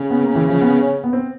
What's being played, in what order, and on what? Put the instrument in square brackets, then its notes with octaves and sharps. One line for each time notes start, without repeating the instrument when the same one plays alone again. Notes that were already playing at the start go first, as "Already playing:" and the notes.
Already playing: [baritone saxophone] C#3
[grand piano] B3
A#3
E3
F3
B3
C#4
B3
C4